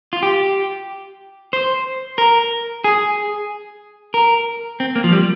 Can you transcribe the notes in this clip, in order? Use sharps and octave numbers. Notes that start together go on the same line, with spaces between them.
F4
G4
C5
A#4
G#4
A#4
C4
A#3
F3
G3